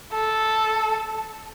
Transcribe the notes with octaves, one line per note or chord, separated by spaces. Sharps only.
A4